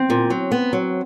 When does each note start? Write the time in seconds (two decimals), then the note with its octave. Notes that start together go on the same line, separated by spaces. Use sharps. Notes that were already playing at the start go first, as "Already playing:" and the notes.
Already playing: C4
0.10 A#2
0.30 F#3
0.52 B3
0.73 F#3